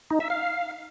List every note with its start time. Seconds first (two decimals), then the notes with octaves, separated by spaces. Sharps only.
0.11 D#4
0.20 E5
0.30 F5